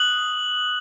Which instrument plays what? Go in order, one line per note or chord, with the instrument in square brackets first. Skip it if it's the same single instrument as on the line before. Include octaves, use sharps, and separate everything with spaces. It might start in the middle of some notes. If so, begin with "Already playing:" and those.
Already playing: [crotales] D#6 F#6 F#7